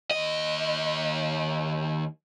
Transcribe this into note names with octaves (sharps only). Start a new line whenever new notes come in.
D#2 D#5